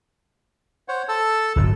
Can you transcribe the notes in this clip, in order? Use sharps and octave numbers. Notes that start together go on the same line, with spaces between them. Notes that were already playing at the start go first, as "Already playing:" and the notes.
C5 C#5 F#5
A4 A5 E6
D1 G1 A#2